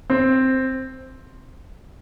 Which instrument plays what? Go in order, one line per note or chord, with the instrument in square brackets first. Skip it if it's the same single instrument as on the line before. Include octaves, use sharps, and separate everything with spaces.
[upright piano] C4